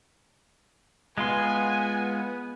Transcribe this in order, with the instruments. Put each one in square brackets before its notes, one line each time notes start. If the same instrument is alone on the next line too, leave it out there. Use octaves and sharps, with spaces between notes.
[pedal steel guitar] G#3 F4 C6 [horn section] B3 [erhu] G#5